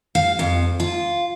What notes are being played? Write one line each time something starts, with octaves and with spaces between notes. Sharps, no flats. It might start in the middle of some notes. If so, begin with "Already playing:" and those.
F5
F2
F4